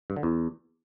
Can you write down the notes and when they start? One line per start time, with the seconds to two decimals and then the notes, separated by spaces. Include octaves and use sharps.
0.10 G2
0.16 D3
0.23 E2